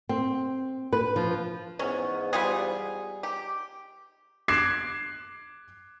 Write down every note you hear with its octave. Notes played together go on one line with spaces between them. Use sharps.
C4
B4
F3
E2 G#2 B3 C#4
G3 F4 G#4
G4
D6 F#6 G#6 C7 E7